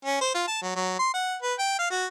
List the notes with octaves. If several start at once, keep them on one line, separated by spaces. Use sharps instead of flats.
C#4
C5
F4
A5
F#3
F#3
C6
F#5
B4
G5
F5
F#4